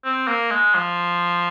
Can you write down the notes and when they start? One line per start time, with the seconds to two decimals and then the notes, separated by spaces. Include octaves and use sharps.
0.04 C4
0.28 A#3
0.51 G#3
0.74 F3